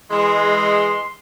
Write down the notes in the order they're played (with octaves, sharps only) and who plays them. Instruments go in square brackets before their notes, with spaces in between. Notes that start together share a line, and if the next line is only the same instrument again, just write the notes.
[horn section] E3 G#3 [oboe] C6